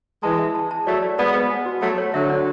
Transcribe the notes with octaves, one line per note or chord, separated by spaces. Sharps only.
E3 G#3 A5
E5
A5
A5
F#3 A3 D5
D5
G#3 B3 D5
B4
G#5
F#4
F#3 A3 F#4
C#5
D3 F#3 E5
D4